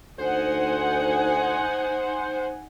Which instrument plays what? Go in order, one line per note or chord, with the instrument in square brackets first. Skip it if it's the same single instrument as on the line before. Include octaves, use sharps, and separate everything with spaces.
[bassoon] D2 [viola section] D#4 F#5 G#5 [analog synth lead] C5